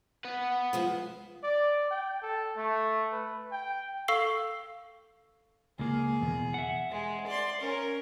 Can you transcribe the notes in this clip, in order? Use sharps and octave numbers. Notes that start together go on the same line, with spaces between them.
B4 F#5
F3 G#3 C5
D5
G5
A4
A3
B4
G5
A4 F5 C#6 E6 C7 G7
C#2 A#3 G#4
E2 B2
E5 F#5
G#3
D5 C6
C#4 A#4